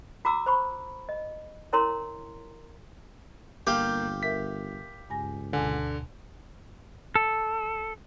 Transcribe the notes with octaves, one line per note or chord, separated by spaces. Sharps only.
F#4 A#5 D6 E6
C5 B5 C#6
D#5
C#4 E4 A#4 C#5 A#5 C6
G1 A#3 G4 F5 G6
A#4 E5 B6
C#2 G2 G#5 A#6
D2 B2 D3 G#5
A4